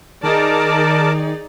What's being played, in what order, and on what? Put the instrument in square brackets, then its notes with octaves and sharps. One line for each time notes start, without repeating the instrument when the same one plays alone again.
[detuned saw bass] D#3 [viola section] D#4 G#4 D5 [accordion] A#4 A5 D6